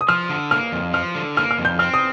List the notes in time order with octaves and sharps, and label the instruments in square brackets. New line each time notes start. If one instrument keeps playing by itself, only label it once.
[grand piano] D#6
[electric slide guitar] F3 [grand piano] F6
[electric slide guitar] D3
[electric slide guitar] A#3 [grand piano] F6
[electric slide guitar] F2
[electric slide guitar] F3 [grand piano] F6
[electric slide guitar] D3
[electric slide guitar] A#3 [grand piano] F6
[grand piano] F6
[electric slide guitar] F2
[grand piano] G6
[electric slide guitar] C4 [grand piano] F6
[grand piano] D#6